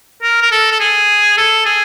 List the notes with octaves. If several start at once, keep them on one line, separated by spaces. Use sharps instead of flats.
A#4
A#4
A4
A4
G#4
A4
G#4